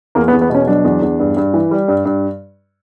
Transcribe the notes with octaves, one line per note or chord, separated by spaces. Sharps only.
E2 A#3
B3
E2
B3
B2 C#4
F#3 D4
E2
E2
G2
G2
E3
G3
G2
G2